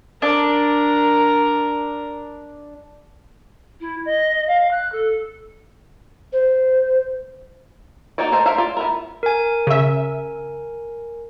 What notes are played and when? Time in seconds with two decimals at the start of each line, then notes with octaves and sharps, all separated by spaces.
0.22 D4 A#4
3.80 E4
4.05 D#5
4.48 F5
4.71 F#6
4.92 A4
6.33 C5
8.18 A#3 D#4 F#4 C#5 D5
8.32 G#3 A4 A#4 C5 A#5
8.45 A#4 C5 C#5 E5 F5
8.58 F4 D5
8.77 B3 E4 A#4
9.23 A#4 G#5
9.67 C#3 E5